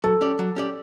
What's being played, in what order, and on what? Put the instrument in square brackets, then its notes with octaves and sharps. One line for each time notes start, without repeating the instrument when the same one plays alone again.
[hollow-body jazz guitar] F#3 [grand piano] A4
[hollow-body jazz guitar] C#4 G4 D5
F#3
C#4 G4 D5